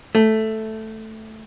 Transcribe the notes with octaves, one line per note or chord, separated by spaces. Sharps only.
A3